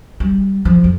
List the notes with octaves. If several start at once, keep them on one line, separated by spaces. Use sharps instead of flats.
G3
F3
F2